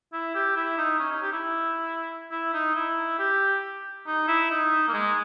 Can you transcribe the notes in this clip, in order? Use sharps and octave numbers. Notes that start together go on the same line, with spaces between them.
E4
G4
E4
D#4
C#4
D#4
G4
E4
E4
D#4
E4
G4
D#4
E4
D#4
A#3
G#3